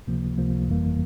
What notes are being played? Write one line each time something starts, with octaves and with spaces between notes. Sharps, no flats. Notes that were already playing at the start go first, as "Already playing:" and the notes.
C#2 C3 F3 A#3
C#2 C3 F3 A#3
G1 F2 E3 G3 A#3